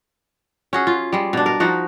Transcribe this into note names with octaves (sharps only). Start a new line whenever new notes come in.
C#4 F#4 G#4
F4
G3 G#3
B2 D4
A#4
F3 D#4 F#4